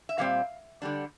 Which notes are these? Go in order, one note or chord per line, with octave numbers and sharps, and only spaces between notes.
E5
A#2 G3 C4 F5
D3 G3 D4